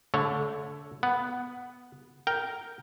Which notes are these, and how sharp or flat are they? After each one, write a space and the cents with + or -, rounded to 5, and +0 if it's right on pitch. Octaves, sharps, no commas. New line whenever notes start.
D3 -25 A3 +0 C#5 +0
B3 +0 F#5 +0
A#4 +0 G5 -10